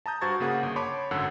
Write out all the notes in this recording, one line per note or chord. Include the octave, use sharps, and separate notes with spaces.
A5 A#5 D#6 G6
G2 F#4 C5 C#6 G#6 A6
C#3 A#3 G#4 F#5 D#6
G1
C#5 A5 B5 C6 D6
G#1 F#2 D3 F#5 E6